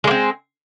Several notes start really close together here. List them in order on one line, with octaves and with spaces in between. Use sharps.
G#3 A#3 C4